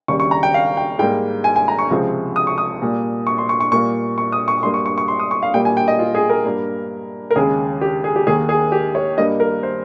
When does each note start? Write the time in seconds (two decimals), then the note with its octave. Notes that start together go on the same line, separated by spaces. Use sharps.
0.08 D#2 C#3 G3 C#6
0.20 C#6
0.31 A#5
0.43 G5
0.54 F5
0.77 G5
0.99 G#2 G3 A#3 G5
1.44 G#5
1.56 G#5
1.68 A#5
1.79 C#6
1.90 C#2 C3 F3 G#3 C4
2.36 D#6
2.47 C#6
2.58 D#6
2.82 A#2 G3 A#3
3.27 C#6
3.38 C6
3.49 C#6
3.61 C#6
3.72 A#2 G3 A#3 C#6
4.18 C#6
4.32 D#6
4.48 C#6
4.63 G2 G3 A#3 C6
4.74 C#6
4.86 C#6
4.98 C#6
5.08 C6
5.20 D#6
5.31 C#6
5.43 F5
5.54 A#2 G3 A#3 G5
5.65 G#5
5.77 G5
5.88 D#5
5.99 F4
6.15 G#4
6.29 A#4
6.44 G2 G3 A#3
7.31 A#4
7.36 D#2 C#3 G#3 G#4
7.81 G4
8.04 G#4
8.16 G4
8.27 D#2 D#3 A#3 G#4
8.49 G#4
8.72 G4
8.95 C#5
9.17 G2 G3 A#3 D#5
9.40 A#4
9.63 C5